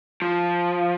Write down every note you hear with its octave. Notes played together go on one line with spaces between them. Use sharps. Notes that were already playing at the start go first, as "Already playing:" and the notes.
F3